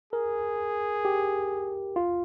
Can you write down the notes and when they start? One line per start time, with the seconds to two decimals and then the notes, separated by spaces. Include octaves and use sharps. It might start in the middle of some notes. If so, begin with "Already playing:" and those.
0.13 G#4 A#4
1.05 G4
1.96 F4